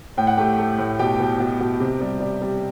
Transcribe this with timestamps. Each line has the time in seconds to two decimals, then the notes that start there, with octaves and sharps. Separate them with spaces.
0.17 A2 G5
0.27 F#5
0.37 A3 G4 G5
0.59 A3
0.78 A2
0.99 B2 G4 G5
1.20 B2
1.40 B2
1.60 B2
1.80 C3
2.01 G3
2.21 G3
2.42 G3